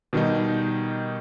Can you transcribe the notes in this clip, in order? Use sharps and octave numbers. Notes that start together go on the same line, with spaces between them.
B2 D#3 G3 D#4